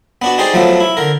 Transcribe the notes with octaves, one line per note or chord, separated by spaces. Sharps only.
B3 D4 F#4
D#4 G4 G#4 C5 D5
F3 F#3 A3 B3
E4
D3 A#4